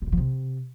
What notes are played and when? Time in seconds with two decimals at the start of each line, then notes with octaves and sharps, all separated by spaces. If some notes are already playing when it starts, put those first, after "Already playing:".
0.02 D3
0.07 C#3
0.12 F3
0.17 C3